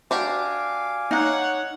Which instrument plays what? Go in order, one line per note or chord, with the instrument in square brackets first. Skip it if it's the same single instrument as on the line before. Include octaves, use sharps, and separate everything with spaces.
[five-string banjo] D4 F#4 G4 [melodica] F5 G#5 D6
[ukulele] D#4 [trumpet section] C#5 F#5